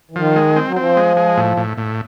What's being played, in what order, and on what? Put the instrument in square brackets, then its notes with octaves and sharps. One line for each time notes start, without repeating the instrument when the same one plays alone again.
[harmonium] E3
[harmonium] D#3 [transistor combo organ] F3
[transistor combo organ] G#3
C4
[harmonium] F#3
[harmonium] F3 [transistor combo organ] C4
[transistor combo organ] G#3
G#3
A2
A2
A2